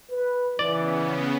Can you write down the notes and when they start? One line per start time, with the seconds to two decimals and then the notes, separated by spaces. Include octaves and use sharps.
0.10 B4
0.59 C#3 E3 B3 D5